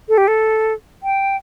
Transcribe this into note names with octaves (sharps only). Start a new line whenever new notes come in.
A4
G4
A4
G5